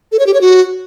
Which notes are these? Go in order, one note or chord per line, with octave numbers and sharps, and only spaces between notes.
A4
C#5
G4
C#5
F#4